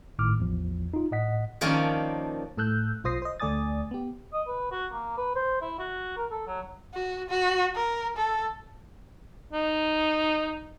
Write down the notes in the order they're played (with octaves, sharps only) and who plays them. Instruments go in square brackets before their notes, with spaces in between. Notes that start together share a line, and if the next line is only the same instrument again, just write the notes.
[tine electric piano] G#1 A2 D#3 D6 F6
A1 E2 F3
D#4 F4
A2 D#5 F#5 B6
[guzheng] D#3 F3 A#3 C#4 D4
[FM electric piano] A2 A4 E6 F#6 G6
B1 F4 C5 D#6 A#6 C7
C5 D#5
D2 A3 D5 G#5 D#6 A6
B3 G4
[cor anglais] D#5
B4
F#4
A#3
B4
C5
E4
F#4
A#4
A4
F#3
[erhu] F#4
F#4
A#4
A4
[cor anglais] D#4